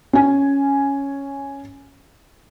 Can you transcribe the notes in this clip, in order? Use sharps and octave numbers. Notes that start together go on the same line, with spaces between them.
C#4 G#5